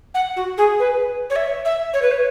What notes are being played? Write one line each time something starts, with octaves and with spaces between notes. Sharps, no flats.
F#5
F#4
G#4
B4
C#5
E5
E5
C#5
B4
C#5